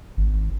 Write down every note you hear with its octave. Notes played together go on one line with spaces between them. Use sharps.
G#1